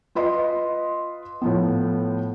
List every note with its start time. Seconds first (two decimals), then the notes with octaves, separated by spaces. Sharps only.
0.15 F4 B4 D#5 C6
1.42 A2 F3 B3